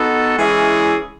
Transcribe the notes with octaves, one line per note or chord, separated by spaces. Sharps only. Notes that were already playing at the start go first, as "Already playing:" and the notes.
Already playing: B3 D#4 F#4 A4
E3 G#3 C#4 E4 G#4